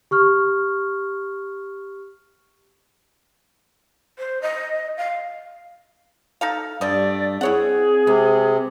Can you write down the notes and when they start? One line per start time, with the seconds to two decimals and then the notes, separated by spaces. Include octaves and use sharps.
0.11 G4 C#6 F6
4.18 C5
4.42 D#5
4.97 F5
6.41 D#4 A4 F5
6.81 G2 G3 A3 D5 D#5
7.41 C4 E4 G#4 C#5 F#5
8.07 C3 G#3 B3